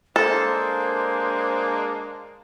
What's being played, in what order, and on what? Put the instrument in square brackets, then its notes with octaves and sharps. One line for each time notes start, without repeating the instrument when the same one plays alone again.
[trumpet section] G#3 A#3 D4 [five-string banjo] A4 [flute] C5